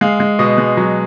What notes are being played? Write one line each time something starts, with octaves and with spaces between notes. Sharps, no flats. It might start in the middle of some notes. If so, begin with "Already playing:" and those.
G#3 F5
G#3
B2 D#5
G#3
F#3